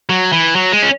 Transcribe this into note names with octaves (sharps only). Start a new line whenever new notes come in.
F#3
E3
F#3
G#3
C#4